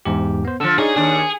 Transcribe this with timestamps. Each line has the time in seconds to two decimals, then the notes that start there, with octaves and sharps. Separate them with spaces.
0.05 E2 G#2 G4
0.45 B3 C5
0.60 D3 F3 A4 E6
0.78 D#4 G#4 C#5 D5
0.96 D#2 D4 G#4